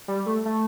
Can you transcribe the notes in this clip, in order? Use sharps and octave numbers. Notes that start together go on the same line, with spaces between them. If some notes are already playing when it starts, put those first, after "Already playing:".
G3
A3
A3